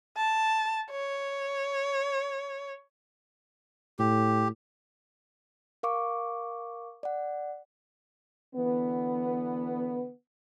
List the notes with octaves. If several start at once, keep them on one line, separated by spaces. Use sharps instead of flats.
A5
C#5
A2 G4
A#4 F5 C#6 D6
D5 F#5
D3 E3 B3